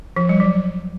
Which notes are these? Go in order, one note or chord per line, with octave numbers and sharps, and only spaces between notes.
F3
G3
F#3